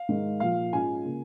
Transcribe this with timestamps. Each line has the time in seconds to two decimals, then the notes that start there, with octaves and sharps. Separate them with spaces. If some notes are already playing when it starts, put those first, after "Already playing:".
Already playing: F5
0.09 G#2 D#3 G#3
0.40 A#2 F3 A#3 F4 F5
0.72 G#2 G#3 C#4 F4 G#5
1.05 C#3 A#3